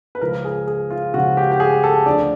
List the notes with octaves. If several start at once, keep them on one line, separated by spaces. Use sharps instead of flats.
B4
C#2 C#3 F3 A#4
G#4
G#4
F4
C#2 C#3 F3 F#4
G4
G4
G#4
A4
D2 D3 F3 D5